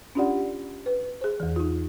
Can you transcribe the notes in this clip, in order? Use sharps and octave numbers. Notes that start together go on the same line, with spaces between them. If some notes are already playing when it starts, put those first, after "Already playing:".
C#4 D4 F4 G4 D5 F#5
B4
G#4 C5
E2 E3
D#4 F4